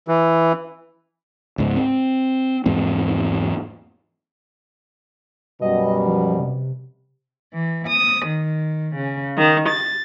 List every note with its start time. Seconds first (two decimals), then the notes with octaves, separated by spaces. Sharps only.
0.08 E3
1.58 C#2 G#2
1.76 C4
2.66 E2 G#2 C4
5.62 F#2 B2 G3 D#5
6.06 F3
6.40 C3
7.54 E3
7.88 D#6
8.26 D#3
8.95 C#3
9.37 D#3
9.67 A6